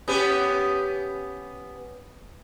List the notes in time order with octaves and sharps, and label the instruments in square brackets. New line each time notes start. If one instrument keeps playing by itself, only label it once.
[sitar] B3 C#4 G4